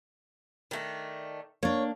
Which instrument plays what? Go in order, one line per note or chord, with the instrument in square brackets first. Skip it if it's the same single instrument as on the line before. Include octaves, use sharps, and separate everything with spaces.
[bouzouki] D#3 A3 D4
[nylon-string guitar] A#3 D4 [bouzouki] C#5